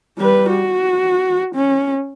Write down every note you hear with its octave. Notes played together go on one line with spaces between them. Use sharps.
G3 B4
F#4
C#4